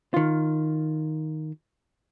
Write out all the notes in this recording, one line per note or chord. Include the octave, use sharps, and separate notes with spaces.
D#3 F4